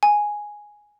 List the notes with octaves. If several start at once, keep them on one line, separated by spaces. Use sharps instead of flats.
G#5